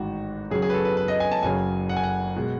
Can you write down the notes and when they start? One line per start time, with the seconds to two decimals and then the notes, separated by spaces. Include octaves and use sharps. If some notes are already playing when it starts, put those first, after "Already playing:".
Already playing: A1 G#2 D#3 F#4
0.51 F#2 C#3 F#3 C#4 G#4
0.62 G#4
0.70 B4
0.74 A4
0.85 B4
0.97 B4
1.08 D#5
1.20 G#5
1.32 A5
1.43 F#1 F#2 C#3 F#3 G#5
1.89 F#5
1.96 G#5
2.03 F#5
2.36 B2 G#3